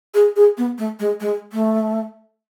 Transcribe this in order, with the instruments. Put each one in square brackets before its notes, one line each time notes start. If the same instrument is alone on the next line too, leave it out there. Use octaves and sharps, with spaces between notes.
[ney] G#4
G#4
B3
A3
G#3
G#3
A3